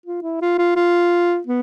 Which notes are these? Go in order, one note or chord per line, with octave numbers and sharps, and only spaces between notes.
F4
E4
F4
F4
F4
B3